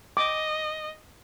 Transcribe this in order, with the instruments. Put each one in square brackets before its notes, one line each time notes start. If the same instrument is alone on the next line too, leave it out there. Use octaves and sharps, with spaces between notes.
[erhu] D#5 [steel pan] D6